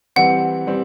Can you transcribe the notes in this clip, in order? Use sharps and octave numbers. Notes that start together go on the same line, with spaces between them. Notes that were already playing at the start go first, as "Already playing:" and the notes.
E3 G3 C4 F#5
E3 G3 C4